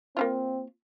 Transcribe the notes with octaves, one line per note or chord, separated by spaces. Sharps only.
A#3 C4 E4 F4